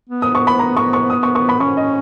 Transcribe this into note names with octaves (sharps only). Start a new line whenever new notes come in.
B3
D#6
C#6
B5
A#5
C#6
C#6
D#6
C#6
C#6
B5
C#4 C#6
D#5